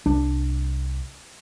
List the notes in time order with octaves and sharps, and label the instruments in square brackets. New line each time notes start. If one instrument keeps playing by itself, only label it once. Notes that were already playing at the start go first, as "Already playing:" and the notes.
[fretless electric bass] C2 D4